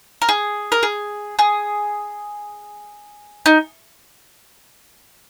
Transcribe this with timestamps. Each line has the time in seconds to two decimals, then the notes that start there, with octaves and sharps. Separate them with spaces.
0.22 A#4
0.29 G#4
0.72 A#4
0.83 G#4
1.39 G#4
3.46 D#4